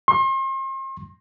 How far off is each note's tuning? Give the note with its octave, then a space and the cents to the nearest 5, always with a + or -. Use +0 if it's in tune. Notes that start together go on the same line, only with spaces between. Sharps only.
C6 +40